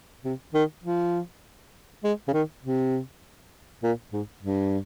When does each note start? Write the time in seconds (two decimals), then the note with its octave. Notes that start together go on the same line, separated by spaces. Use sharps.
0.24 C3
0.54 D#3
0.84 F3
2.04 G#3
2.28 C#3
2.33 D#3
2.63 C3
3.83 A#2
4.13 G#2
4.42 G2